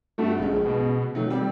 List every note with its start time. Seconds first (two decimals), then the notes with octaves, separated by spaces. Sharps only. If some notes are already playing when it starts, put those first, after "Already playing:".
0.18 G2 A3 F#4
0.38 A#1 C#3 G#3
0.65 B2
1.15 D#3 F#3 A3
1.30 G3 C4